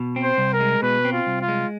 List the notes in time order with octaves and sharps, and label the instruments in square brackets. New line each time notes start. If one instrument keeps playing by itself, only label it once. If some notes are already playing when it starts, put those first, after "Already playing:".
Already playing: [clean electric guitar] B2
C4
[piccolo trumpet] C5
[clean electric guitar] C2
[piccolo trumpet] A#4
[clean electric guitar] G#3
[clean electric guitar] B2 [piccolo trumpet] B4
[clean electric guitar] C4
[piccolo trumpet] F4
[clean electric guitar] C2
[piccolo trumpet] F4
[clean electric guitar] G#3